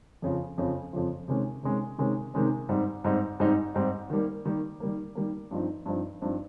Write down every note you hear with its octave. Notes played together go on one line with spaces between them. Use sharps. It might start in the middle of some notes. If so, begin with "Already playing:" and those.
F2 C#3 F3
F2 C#3 F3
F2 C#3 F3
C3 D#3 G#3 C#4
C3 D#3 G#3 C#4
C3 D#3 G#3 C#4
C3 D#3 G#3 C#4
G#2 G3 C4 D#4
G#2 G3 C4 D#4
G#2 G3 C4 D#4
G#2 G3 C4 D#4
D#3 G3 A#3
D#3 G3 A#3
D#3 G3 A#3
D#3 G3 A#3
G2 F3 C4 D#4
G2 F3 C4 D#4
G2 F3 C4 D#4